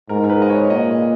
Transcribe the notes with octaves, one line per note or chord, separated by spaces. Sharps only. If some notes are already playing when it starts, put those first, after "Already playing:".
G#2 A#4
A#4
B4
D#5
C#5
A#2 D#5